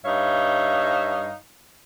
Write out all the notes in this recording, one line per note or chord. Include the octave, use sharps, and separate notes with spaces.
G2 D#4 C#5 E5 F5